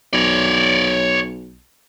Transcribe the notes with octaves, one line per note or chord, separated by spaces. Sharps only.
B1 C#5 D5